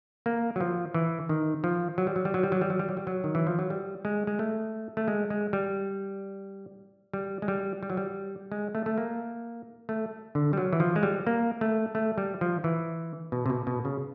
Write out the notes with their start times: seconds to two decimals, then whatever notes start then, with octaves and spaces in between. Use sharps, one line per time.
0.26 A#3
0.56 F#3
0.61 F3
0.94 E3
1.29 D#3
1.64 F3
1.98 F#3
2.07 G3
2.16 F#3
2.25 G3
2.34 F#3
2.43 G3
2.52 F#3
2.61 G3
2.70 F#3
2.79 G3
2.89 F#3
2.97 G3
3.07 F#3
3.24 D#3
3.35 E3
3.47 F3
3.59 F#3
3.70 G3
4.05 G#3
4.27 G#3
4.39 A3
4.97 A3
5.08 G#3
5.30 G#3
5.53 G3
7.13 G3
7.42 G#3
7.48 G3
7.83 G3
7.90 F#3
7.97 G3
8.52 G#3
8.75 A3
8.86 A3
8.98 A#3
9.89 A3
10.35 D3
10.53 G3
10.57 F#3
10.73 E3
10.80 F3
10.96 G#3
11.03 G3
11.27 A#3
11.61 A3
11.95 A3
12.18 G3
12.41 F3
12.64 E3
13.32 B2
13.46 C3
13.50 B2
13.67 B2
13.85 C#3